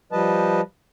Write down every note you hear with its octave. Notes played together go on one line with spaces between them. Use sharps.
F3 G3 B4 D#5 A5